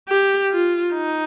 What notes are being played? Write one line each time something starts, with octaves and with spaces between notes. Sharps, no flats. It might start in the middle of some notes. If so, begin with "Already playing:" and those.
G4
F4
D#4